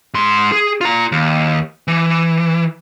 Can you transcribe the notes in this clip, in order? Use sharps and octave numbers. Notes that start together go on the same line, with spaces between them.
G#2 C6
G#4
F4 A#5
D#2
E3